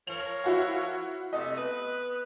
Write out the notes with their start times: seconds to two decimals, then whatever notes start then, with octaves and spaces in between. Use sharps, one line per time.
0.07 F3 A#4 C#5 F7
0.44 E4 F#4 F5
1.33 C3 A3 D#5
1.58 B3 B4